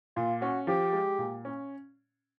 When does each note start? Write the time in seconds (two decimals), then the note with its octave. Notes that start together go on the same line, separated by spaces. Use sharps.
0.16 A#2 F4
0.42 C#4 F#4
0.67 F3 G4
0.93 G#3
1.18 A#2
1.45 C#4